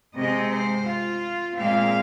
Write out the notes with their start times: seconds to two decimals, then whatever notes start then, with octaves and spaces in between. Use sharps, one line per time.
0.16 C3 G#3 C4 D#5
0.51 C5
0.86 F4
1.57 A#2 G#3 C4 F5